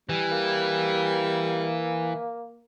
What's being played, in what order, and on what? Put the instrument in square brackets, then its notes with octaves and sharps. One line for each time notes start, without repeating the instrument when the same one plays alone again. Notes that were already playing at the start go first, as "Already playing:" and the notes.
[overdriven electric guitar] E3 [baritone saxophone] G3
[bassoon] A#3